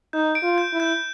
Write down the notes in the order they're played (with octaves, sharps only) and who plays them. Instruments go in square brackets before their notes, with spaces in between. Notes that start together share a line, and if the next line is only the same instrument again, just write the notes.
[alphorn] D#4 [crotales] G6
[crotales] D7
[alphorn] F4
[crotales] G6
[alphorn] E4
[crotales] G6